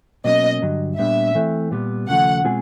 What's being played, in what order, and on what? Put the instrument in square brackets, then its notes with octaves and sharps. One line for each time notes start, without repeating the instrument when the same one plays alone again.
[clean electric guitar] B2 F#3 A#3 C#4 [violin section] D#5
[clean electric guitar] G2 D3 F#3
[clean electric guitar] A#2 G3 B3 D4 [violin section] E5
[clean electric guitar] E3 A3 C4
A#2 G3 B3
[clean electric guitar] D#2 C#3 F3 A3 [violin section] F#5
[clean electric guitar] B2 G#3 C4 F4 G#4